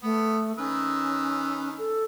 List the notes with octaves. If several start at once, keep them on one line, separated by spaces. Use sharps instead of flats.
A3 B3
D#3 C#4 B4 E6
A4